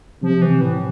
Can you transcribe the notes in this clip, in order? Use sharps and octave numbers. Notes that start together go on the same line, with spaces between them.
C3 F3
E3
A2